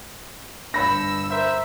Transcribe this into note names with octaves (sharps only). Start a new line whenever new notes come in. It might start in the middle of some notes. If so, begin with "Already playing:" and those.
G1 D4 B5 E6 A#6 C#7
A#4 C5 E5